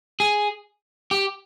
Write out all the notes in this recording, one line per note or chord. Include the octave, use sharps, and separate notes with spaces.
G#4
G4